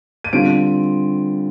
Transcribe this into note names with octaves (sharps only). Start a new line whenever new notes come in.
D#7
D3 G3 C4 F4 D7